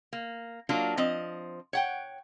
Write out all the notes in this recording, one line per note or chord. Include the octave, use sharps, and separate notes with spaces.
A#3
F#3 A#3 D4 F4
F3 C4 D#5
C#5 F#5 G5